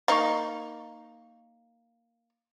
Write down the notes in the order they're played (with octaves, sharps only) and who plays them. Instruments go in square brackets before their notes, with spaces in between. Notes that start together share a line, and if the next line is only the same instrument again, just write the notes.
[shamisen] A#3 D#4 [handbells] F5 C#6